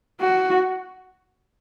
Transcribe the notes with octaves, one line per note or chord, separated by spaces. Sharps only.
F#4